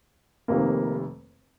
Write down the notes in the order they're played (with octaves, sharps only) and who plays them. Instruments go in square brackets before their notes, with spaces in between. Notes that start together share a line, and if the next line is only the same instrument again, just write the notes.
[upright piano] F1 F2 C3 D#3 A#3